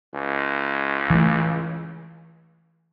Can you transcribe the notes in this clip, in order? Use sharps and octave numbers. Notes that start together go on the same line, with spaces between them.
C#2
E3 A3